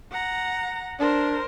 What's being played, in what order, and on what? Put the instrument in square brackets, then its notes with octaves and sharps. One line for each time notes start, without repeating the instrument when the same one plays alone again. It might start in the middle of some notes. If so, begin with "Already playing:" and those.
[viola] F#5 A#5
[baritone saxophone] D4 [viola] A#4 C5